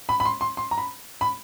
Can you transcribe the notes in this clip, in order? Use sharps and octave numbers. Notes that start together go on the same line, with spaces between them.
B5
B5
C6
C6
C6
A#5
B5
B5